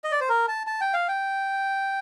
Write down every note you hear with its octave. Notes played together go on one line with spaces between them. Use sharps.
D#5
D5
C5
A#4
A5
A5
G5
F5
G5